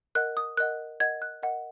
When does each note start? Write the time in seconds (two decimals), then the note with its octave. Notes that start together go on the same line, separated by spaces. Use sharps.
0.15 A#4 D#5 F#5 F#6
0.37 D#6
0.57 A#4 D#5 F#5 F#6
1.00 A#4 D#5 F#5 G#6
1.22 F#6
1.43 A#4 D#5 F#5